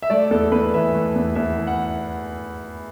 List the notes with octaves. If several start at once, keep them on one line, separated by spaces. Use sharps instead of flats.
E5
A3 D5
E2 A4
E2 B4
E3 E5
A3
E2
E2 E5
E3
F#5